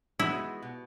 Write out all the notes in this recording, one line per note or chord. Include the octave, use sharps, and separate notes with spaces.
G#3 B3 D#4 E4 F#4
B2